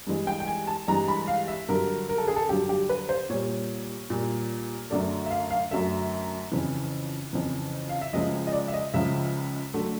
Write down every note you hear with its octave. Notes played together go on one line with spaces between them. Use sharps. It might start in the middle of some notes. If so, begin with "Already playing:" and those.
G2 E3 G#3
G5
G5
G#5
A5
G2 E3 G#3 A#5
B5
F5
E5
G2 D3 F#3 A#4
A#4
A4
G#4
A4
G2 D3 F#3 G4
G4
B4
C5
A#2 G3 C#5
A#2 G3
F#2 D3 F#3 A3 D5
E5
F5
F5
F#2 D3 F#3 A3 E5
F2 C#3 E3
F2 C#3 E3
F5
E5
C#2 C#3 F3 G#3 D#5
D#5
D5
E5
D#5
C#2 C#3 F3 G#3 E5
D3 F#3 A3